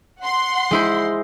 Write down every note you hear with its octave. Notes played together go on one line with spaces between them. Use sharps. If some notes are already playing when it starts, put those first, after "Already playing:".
F#5 C6
G#3 E4 C5